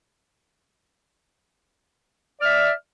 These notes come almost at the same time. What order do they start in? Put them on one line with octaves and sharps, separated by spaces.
D5 F6 E5